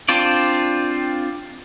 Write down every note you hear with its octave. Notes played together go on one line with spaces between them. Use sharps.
C4 D4 F4 D5